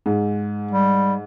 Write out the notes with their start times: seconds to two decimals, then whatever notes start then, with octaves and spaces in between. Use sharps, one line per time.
0.06 G#2
0.71 G3